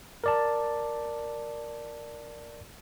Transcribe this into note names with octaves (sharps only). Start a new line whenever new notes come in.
A#4 D5 A5